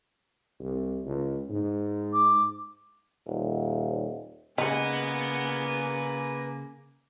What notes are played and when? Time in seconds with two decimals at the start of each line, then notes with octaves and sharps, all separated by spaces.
0.60 C2
1.05 C#2
1.49 G#2
2.13 D6
3.27 D#1
4.58 C#3 G#3 A#3 D#4 B4 F#5 G#5